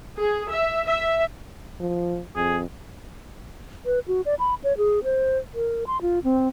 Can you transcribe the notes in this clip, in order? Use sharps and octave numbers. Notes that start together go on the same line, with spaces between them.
G#4
E5
E5
F3
F2 G#4
B4
F#4
D5
B5
C#5
G#4
C5
A#4
C6
F4
C4